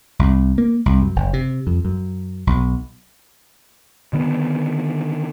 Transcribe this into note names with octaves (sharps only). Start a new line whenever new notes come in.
C2
A#3
C2
F#2
F#1
C3
F2
F#2
B1
D3 D#3 B3